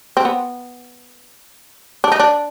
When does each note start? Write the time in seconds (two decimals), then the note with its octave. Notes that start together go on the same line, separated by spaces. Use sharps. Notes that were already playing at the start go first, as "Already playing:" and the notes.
0.17 C4
0.25 B3
2.04 D4
2.12 D#4
2.20 D4